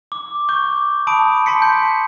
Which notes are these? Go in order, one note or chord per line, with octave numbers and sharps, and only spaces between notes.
D6
C#6 D6 G6
A5 B5 D#6 D7
A5 C6 B6 C#7
G6